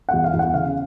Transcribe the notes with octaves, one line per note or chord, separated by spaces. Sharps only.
E2 F#5
F5
E2
F#5
C#3 F5